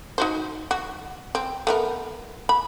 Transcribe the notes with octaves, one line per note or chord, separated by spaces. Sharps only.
D#4 F#4 C5
F#4
C4
A3 B3 A#4
B5